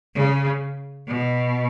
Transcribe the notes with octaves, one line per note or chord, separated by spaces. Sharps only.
C#3
B2